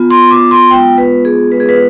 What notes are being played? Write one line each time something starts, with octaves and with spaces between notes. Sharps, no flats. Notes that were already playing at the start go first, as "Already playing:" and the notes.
Already playing: B3 F4
C6
D6
C6
G#3 B3 F4 G5
B4
G#4
G#3 B3 F4 B4
G#4
B4